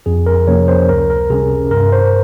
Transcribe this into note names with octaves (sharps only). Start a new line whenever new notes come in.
F2 G#4
A#4
C3 F3 A#3 C#4 C#5
C5
C#2 A#4
A#4
C3 G3 C#4 G#4
G2 A#4
C5